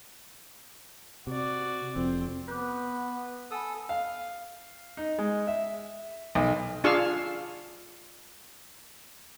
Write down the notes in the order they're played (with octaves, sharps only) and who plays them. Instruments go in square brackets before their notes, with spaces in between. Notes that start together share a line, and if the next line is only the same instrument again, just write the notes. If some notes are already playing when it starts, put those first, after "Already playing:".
[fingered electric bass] C3 [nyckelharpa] F#4 D5
[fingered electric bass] F1 F2 [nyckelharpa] C4
[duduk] B3 [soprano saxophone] B4 [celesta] D6 F#6 G6
[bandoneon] A4 D#6 E6 [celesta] F#5 G#5 B5
[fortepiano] F5
D#4
G#3
E5
B1
[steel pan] D4 F4 G#4 F5 C#6 E6